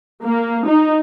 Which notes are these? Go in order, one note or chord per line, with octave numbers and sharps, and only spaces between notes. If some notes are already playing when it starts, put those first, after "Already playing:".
A#3
D#4